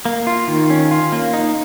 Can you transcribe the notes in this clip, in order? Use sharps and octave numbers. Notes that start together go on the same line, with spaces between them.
A#3
F4
D#3
C#4
F4
A#3
D#4